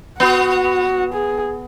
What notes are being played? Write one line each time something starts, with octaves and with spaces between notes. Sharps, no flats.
B3 F#4
G#4